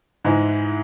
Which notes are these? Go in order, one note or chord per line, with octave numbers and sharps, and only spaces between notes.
G#2 E3 G#3